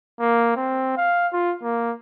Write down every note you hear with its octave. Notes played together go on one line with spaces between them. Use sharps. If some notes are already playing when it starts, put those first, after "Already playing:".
A#3
C4
F5
F4
A#3